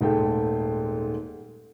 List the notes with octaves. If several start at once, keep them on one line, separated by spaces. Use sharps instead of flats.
D#1 G#2 G#3 A3 G5